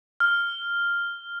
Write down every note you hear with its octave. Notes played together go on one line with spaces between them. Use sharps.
F6